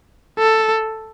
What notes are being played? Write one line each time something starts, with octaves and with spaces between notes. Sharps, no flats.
A4